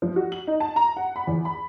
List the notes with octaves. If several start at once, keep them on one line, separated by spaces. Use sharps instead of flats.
F3
F#4
F#7
D#4
A5
A#5
F#5
B5
E2
B5